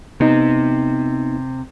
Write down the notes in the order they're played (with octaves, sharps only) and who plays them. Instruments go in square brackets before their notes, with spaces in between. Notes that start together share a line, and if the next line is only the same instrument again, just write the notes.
[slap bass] C3 [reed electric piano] B3 D#4